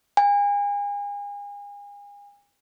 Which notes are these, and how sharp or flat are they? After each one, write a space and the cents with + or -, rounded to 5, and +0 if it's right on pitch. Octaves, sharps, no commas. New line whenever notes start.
G#5 -35